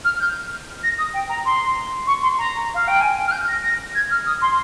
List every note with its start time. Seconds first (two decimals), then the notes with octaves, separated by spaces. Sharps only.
0.04 F6
0.20 G6
0.83 A#6
0.98 D#6
1.13 G5
1.29 A#5
1.45 C6
2.07 C#6
2.22 C6
2.38 A#5
2.74 F5
2.87 G5
3.01 G#5
3.27 F6
3.31 G6
3.48 A#6
3.63 A#6
3.95 G#6
4.10 F6
4.26 D#6
4.41 C6